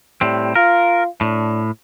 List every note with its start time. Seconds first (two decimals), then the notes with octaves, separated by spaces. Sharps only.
0.21 A2 G3 C4
0.55 F4 A#4
1.21 A2 D4